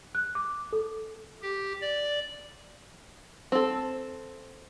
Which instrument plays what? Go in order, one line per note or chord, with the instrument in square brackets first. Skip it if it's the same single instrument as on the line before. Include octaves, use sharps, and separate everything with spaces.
[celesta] F#6
D6
A4
[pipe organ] G4
D5
[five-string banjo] C4 A4